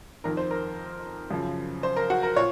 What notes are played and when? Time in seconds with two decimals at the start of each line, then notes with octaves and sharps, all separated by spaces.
0.24 F2 D#3 A#4
0.37 C5
0.51 A#4
1.31 F#2 C#3 F3
1.83 C5
1.96 A#4
2.10 F#4
2.23 A#4
2.36 A#2 C#5